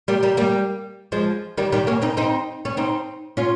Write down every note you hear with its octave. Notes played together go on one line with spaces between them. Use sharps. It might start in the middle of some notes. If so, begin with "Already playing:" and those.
G3 A#3
G3 A#3
G3 A#3
F3 G#3
D#3 G3
D#3 G3
A#3 C#4
C4 D#4
C4 D#4
C#4
C4 D#4
C#4 F4